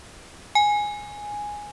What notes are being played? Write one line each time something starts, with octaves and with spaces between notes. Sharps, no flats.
G#5